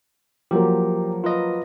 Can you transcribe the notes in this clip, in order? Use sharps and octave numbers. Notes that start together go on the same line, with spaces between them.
F3 F#3 A#3 G4
F4 B4 D#5